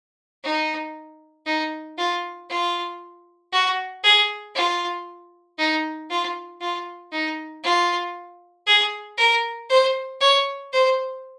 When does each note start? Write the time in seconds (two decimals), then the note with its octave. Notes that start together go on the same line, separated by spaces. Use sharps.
0.44 D#4
1.46 D#4
1.98 F4
2.49 F4
3.52 F#4
4.04 G#4
4.55 F4
5.58 D#4
6.10 F4
6.61 F4
7.12 D#4
7.64 F4
8.67 G#4
9.17 A#4
9.69 C5
10.21 C#5
10.72 C5